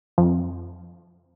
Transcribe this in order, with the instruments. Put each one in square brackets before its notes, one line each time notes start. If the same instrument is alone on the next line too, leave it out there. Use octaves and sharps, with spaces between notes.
[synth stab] F2